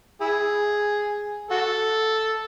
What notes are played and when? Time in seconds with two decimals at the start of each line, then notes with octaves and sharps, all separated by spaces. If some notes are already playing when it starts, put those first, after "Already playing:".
0.21 E4 G#4
1.51 F#4 A4